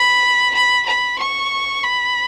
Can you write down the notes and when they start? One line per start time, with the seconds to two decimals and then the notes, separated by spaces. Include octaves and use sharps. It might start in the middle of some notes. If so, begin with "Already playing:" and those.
Already playing: B5
0.54 B5
0.86 B5
1.18 C#6
1.83 B5